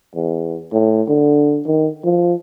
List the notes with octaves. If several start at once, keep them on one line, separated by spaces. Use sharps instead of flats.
E2
A2
D3
D#3
F3